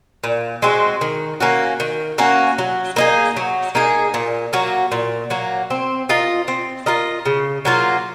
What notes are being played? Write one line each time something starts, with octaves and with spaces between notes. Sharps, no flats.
A#2
G#3 C4 F#4
D#3
A#3 C#4 F#4
D#3
A#3 C#4 F#4
F#3
A#3 D#4 G#4
F#3
A#3 D#4 G#4
A#2
F#3 A#3
A#2
F#3 A#3
C4
F4 A#4 D#5
C4
F4 A#4 D#5
C#3
F#3 A#3 F4